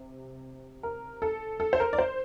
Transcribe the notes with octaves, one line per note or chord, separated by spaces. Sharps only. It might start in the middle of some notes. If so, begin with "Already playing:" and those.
Already playing: C3
A#4
A4
A4
C5
A#4
D5
C5